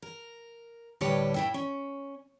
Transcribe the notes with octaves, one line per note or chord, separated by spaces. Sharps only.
A#4
D2 A2 G3 G4 B4 C#5
A2 E4 G5
C#4